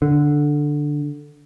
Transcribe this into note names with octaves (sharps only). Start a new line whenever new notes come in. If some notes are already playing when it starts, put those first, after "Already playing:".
D3